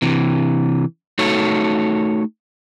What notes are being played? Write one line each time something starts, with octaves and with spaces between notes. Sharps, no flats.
C3 E3
A3 D#4 F#4 A4 C#5